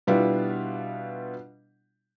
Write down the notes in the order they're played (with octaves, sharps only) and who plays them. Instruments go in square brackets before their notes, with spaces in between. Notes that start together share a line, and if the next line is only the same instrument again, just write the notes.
[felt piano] B2 G3 B3 D4 E4 F4